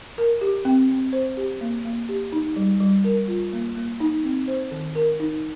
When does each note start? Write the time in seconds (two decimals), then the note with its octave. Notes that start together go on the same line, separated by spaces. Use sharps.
0.18 A#4
0.41 G4
0.65 C4
0.90 C4
1.13 C5
1.37 G4
1.61 A#3
1.85 A#3
2.09 G4
2.32 D#4
2.56 G3
2.80 G3
3.04 A#4
3.28 F4
3.53 A#3
3.76 A#3
4.00 D#4
4.24 C4
4.48 C5
4.71 D#3
4.95 A#4
5.20 D#4